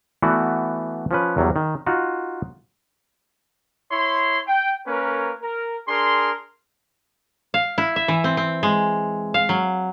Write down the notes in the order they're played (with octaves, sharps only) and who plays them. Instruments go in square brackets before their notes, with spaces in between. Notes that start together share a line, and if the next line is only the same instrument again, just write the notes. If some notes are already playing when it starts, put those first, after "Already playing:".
[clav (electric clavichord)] E3 A3 B3 F#4 D5
F3 C#4 B4
E2 F#3 G3
D#3
D#4 F4 F#4
[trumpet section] E4 C#5 C6
G5
A#3 C#4 A#4 B4 C#5
A#4
D4 G#4 A#4 C6
[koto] F5
E4
E5
E3
C4
C4
G#3
F5
F#3